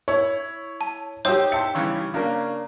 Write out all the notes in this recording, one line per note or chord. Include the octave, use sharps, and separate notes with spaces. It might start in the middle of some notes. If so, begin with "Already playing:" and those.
E4 C#5
A5
D#4 G4 C5 C#5 G5 D#6 E6
E5 A5 C6 C#7
G2 C#3 E3
C#3 A#3 D4 A#4